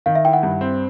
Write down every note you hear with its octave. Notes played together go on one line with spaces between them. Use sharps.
D#3 F5
E5
E4 G5
F#5
G2
C4